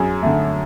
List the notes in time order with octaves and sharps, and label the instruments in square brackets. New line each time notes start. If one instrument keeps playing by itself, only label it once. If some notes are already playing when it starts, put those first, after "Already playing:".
Already playing: [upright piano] F#2 G#4
D3 A3